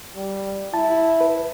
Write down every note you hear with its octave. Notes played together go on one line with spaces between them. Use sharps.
G3
E4 A5
B4